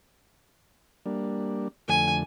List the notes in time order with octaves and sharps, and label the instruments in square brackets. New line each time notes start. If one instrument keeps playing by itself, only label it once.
[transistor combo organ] G3 A#3 D4
[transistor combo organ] F2 D3 A3 [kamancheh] G#5